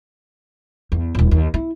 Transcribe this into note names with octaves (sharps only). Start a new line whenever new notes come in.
E2
D#1 A#1
D#2
E4